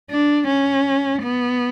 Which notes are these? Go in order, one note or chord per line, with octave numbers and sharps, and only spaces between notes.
D4
C#4
B3